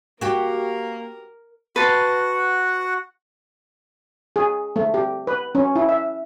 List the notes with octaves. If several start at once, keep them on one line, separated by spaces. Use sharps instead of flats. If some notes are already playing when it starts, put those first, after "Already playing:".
A#3 F#4 G4 A#4
F#4 B4 F#5 A5 C6
G#4
A3
G4
B4
C#4
E4
E5